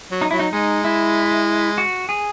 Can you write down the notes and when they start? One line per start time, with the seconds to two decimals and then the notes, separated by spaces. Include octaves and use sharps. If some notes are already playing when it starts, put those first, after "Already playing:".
0.11 F#3
0.21 D#4
0.31 F#3 E4
0.39 D#4
0.52 G#3 D#4
0.84 E4
1.78 F#4
2.09 G#4